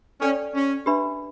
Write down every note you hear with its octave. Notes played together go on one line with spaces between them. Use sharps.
C#4 A4 D5 G5
C#4
D4 G4 B4 E5 B5